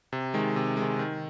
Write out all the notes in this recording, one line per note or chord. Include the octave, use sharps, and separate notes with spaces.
C3
D#3 G#3
C3
G#3
D#3
D#3